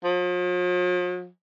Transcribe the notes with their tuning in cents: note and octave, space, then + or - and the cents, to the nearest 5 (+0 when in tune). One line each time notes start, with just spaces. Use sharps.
F3 +45